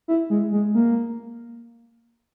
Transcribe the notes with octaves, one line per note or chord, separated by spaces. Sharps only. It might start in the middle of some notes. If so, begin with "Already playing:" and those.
E4
G#3
G#3
A#3